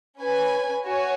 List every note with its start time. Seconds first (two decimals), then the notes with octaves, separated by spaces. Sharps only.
0.20 C#4 B4 G#5
0.85 F#4 C#5 G#5